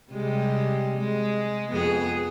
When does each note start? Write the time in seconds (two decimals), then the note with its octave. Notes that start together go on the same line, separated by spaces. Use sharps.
0.11 C3 G3 G#3
0.97 G#3
1.69 F2 B3 G#4